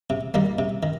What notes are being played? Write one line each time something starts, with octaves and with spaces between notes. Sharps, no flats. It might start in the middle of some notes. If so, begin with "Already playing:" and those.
C3
D#3 G3 A#3
C3
D#3